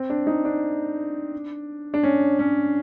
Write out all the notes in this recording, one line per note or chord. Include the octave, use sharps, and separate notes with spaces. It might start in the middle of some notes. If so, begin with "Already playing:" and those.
Already playing: C4
D4
D#4
D4
D4
C#4
C#4